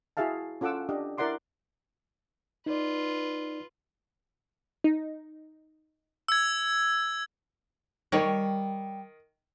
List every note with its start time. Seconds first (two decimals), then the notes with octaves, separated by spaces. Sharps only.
0.17 E4 F#4 G#4 E5 F5 A5
0.61 C#4 F4 A4 F#5 D6 E6
0.89 D4 G4 D#5
1.18 E4 A#4 D5 F#5 C6 D6
2.66 D#4 F4 B4 D5
4.84 D#4
6.28 E6 G#6
8.12 D#3 G3 C#5